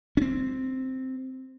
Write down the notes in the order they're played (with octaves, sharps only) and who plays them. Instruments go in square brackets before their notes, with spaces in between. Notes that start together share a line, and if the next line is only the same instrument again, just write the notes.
[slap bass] C4 C#4